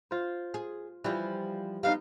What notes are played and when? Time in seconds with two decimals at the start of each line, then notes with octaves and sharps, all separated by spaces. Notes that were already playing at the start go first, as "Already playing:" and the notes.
0.11 F4 C5
0.54 G#4
1.04 E3 F3 G3 F4
1.83 G3 B3 D#4 F5